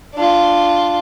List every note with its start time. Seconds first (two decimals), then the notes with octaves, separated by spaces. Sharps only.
0.14 D4 F4